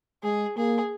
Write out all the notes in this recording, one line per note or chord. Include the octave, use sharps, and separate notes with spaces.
G#3 G#4
A#3 G#4